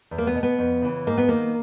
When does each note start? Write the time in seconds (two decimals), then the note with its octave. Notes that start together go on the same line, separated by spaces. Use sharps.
0.11 E2
0.18 A#3
0.27 B3
0.35 B2
0.43 B3
0.59 F2
0.82 C#3 E3
1.07 G#2 A#3
1.18 B3
1.29 D#3 A#3